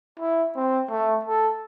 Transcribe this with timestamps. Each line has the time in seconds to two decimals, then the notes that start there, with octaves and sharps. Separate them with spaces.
0.19 E4
0.56 C4
0.90 A3
1.25 A4